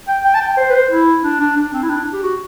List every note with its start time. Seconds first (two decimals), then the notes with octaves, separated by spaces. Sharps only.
0.08 G5
0.25 G5
0.35 A5
0.41 G5
0.57 C5
0.70 B4
0.74 C5
0.91 E4
1.24 D4
1.40 D4
1.57 D4
1.73 C4
1.83 E4
1.89 D4
2.13 G4
2.23 F#4